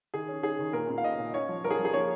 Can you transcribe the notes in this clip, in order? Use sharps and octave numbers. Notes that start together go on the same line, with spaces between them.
D#3 G#4
C#4
C#4 G#4
D#3
A#2 A#4
A#2
F5
C#4 D#5
A#2
C#4 C#5
F3
F3 A#4
G#4
F3
G#4
A#3 C#5